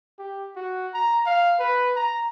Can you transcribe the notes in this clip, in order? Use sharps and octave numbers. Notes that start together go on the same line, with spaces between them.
G4
F#4
A#5
F5
B4
A#5